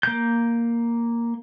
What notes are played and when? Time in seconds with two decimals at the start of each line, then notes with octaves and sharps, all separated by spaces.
0.03 A#3 G6